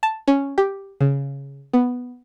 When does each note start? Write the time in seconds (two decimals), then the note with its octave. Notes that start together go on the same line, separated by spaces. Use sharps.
0.03 A5
0.28 C#4
0.58 G4
1.01 C#3
1.73 B3